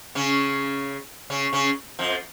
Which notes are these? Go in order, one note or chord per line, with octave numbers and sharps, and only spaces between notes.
C#3 C#4
C#3 C#4
C#3 C#4
F2 F3